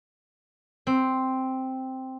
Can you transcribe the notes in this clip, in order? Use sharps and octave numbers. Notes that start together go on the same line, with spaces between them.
C4